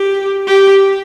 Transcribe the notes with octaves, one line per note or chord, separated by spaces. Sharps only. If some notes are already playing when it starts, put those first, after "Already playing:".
Already playing: G4
G4